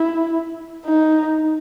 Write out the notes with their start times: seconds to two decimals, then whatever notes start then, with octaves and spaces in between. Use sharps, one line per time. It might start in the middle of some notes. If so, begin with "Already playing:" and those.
Already playing: E4
0.86 D#4